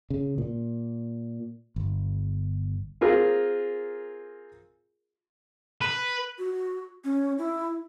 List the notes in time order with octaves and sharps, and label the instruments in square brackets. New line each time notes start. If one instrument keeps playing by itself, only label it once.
[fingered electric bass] C#3
A#2
G1
[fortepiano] C4 F4 G#4 A#4
[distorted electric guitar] B4
[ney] F#4
C#4
E4